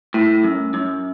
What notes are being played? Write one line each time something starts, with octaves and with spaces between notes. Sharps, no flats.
A2
F#2
F#2